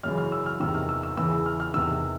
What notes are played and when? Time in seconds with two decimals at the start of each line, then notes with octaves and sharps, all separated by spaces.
0.03 F#2 C#3 E3 F6
0.18 F6
0.32 E6
0.46 F6
0.60 E2 C3 D#3 E6
0.75 F6
0.89 E6
1.03 E6
1.17 E2 C#3 E3 E6
1.46 F6
1.60 F6
1.74 E2 C3 D#3 E6